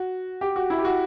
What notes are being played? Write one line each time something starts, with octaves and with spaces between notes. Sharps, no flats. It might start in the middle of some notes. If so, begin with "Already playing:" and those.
Already playing: F#4
G4
F#4
E4
G4
F#4